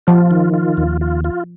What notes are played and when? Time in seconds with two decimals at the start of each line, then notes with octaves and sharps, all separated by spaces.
0.07 F3 F4
0.31 D#3
0.54 F4
0.77 D#2
1.01 F4
1.24 F4